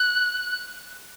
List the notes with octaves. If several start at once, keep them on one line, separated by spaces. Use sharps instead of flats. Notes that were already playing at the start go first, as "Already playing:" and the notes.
Already playing: F#6